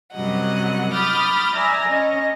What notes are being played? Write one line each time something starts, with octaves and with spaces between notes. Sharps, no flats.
F#2 C3 F#3 G3 D#5 F#5
B5 D6 D#6 F6 G6 A6
D5 E5 G#5 A#5
C#4 D#5